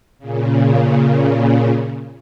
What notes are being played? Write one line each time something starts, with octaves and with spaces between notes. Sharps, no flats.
A#2 C#3